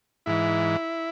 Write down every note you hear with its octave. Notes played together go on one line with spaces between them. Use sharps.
G#2 E3 E4